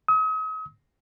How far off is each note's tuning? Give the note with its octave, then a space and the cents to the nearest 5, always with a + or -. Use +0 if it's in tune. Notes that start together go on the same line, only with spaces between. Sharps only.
D#6 +40